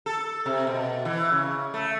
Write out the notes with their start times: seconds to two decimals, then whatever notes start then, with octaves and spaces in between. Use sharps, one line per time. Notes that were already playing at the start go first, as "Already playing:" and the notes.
0.06 A4
0.46 C3
0.67 B2
1.05 E3
1.31 C#3
1.74 A3